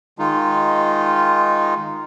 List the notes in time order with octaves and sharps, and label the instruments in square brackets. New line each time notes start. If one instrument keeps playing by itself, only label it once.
[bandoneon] D#3 G#3 D#4 F4